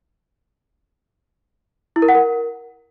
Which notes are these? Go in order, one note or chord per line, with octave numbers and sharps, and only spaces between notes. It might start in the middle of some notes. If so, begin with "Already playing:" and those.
E4
A#4
F#5
A#4